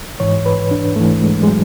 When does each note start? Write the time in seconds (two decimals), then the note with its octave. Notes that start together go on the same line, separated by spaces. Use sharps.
0.20 G#2 E3 C#5
0.46 B4
0.71 D4
0.96 G#2 E3 A3
1.22 G#3
1.43 G#3
1.48 F#3